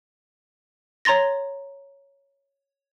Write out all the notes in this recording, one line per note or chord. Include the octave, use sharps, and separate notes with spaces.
C#5 A#5 C6 A6 A#6